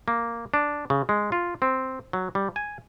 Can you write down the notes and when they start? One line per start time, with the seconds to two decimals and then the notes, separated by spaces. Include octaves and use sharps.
0.08 A#3
0.54 D4
0.90 C#3
1.09 G#3
1.32 F4
1.62 C4
2.13 F#3
2.35 G3
2.56 G#5